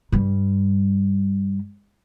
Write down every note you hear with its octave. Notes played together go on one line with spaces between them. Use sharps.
G2 G3